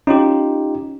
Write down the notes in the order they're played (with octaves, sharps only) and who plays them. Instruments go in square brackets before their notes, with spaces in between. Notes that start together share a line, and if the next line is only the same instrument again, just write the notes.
[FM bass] C#4 [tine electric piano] D#4 F4 G4